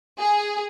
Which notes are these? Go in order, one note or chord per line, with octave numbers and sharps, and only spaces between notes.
G#4